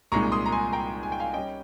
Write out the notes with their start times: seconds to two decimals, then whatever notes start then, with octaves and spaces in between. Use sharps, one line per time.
0.12 C2 A#2 G#3 D#4 A#5 C#6
0.32 C6 D#6
0.46 A#5
0.52 G#5 C6
0.73 G5 A#5
1.03 G#5
1.12 G5
1.20 F5 G#5
1.33 G3 C#4 D#5 G5